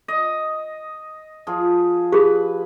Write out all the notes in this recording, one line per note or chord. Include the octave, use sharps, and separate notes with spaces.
D#5
F3 G#4
G4 G#4 B4